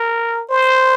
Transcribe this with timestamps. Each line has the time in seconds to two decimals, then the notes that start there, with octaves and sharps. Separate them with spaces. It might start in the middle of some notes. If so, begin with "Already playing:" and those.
Already playing: A#4
0.50 C5